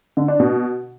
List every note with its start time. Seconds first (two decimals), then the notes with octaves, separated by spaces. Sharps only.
0.17 D3
0.28 D4
0.40 B2